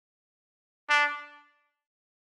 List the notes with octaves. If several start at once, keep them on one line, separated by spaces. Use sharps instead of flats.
D4